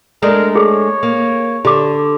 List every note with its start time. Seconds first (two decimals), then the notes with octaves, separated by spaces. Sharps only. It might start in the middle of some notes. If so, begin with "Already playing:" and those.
0.23 G#3 A3 D4 A#4
0.56 G#4 A4 C#5
1.03 A#3
1.65 D3 G4 D6